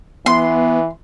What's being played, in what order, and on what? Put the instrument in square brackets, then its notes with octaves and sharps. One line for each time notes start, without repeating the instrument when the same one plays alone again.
[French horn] E3 [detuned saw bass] B3 [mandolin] C6